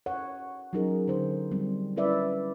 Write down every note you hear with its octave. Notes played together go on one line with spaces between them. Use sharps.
C#5 F#5
F#3 C#4 D#4 G#4 A#4
D3 C5
G3 C4
C#4 E4 B4 D5 E5